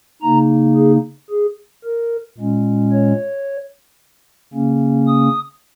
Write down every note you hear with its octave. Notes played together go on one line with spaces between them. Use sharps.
C#3 A#3 D#4 A#5
G#4
G#4
A#4
A#2 G#3 C#4
C#5
C#3 A#3 C#4
D#6